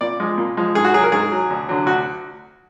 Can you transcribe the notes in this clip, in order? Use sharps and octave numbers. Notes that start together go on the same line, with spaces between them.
A#2 D5
F3 G#3
A#2
F3 G#3
G#2 G#4
F#4
F#3 G#4
A#4
G#2 G#4
F#3
D2
D3 F#3
D2 F#4